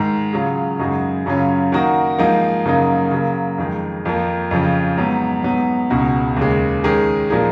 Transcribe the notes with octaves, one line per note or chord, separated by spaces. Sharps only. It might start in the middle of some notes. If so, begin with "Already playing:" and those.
Already playing: G#2 D#3 G#3
C#3 F#3 C#4 F4 G#4
F#2 C#3 G#3 D#4 F#4
F#2 C#3 F#3 C#4 F4
D#3 A#3 D#4 F#4
G#2 F3 A#3 D#4
F#2 C#3 F#3 A#3 D#4
C#3 F#3 A#3
F2 D#3 G#3
F2 F3 A#3
F2 C#3 F3
G#2 F#3 B3
G#2 F#3 B3 D#4
C#2 B2 G#3 D#4 F#4
D#2 C#3 G#3
D#3 G#3 C#4 G#4
A#2 F3 A#3 D#4 G#4